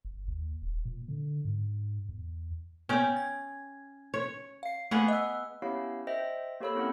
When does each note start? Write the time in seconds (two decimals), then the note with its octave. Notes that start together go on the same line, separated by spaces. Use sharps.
0.05 G1
0.28 D#2
0.62 D#1
0.85 A#2
1.08 D3
1.45 G#2
2.09 E2
2.89 B3 C#4 C#5 G5
3.16 G#6
4.14 C#5
4.63 F5 C7
4.91 A3 B3 G#4 F#5
5.08 D#5 E6
5.62 B3 C#4 E4 G4 C#5 F5
6.07 C5 D#5 E5 G5 A#6
6.60 A#3 G4 A4 C#5 B5 E6
6.75 C4 C#4 E4 F#5